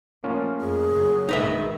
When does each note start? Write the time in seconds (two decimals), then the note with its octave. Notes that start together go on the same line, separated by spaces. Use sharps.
0.24 F3 A3 A#3 C#4 F4
0.61 F2 G#4
0.93 C#3 F#3
1.29 G#1 D#3 D#4 B4 E5